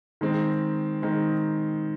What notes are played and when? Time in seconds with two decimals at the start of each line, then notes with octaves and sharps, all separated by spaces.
0.21 D#3 G#3 C4
1.02 D#3 G#3 C4